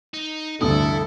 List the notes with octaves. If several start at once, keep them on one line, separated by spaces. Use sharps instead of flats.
D#4
F1 D2 G2 D3 E4 A4 D#6